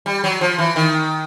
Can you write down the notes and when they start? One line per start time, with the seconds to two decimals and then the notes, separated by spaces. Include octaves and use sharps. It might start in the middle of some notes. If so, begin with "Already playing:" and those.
0.06 G3
0.24 F#3
0.41 F3
0.58 E3
0.76 D#3